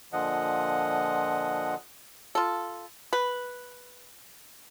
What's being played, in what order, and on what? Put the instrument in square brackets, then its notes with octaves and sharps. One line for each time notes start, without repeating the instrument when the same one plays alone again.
[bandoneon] A#2 D3 F3 D#5 F#5
[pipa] F4 A4
B4